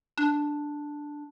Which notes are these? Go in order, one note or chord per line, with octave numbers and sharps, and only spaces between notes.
D4